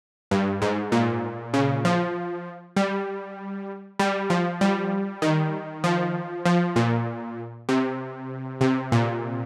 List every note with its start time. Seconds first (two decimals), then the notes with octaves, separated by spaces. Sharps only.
0.31 G2
0.62 G#2
0.92 A#2
1.54 C#3
1.85 F3
2.76 G3
3.99 G3
4.30 F3
4.61 G3
5.22 D#3
5.84 F3
6.45 F3
6.76 A#2
7.69 C3
8.61 C3
8.92 A#2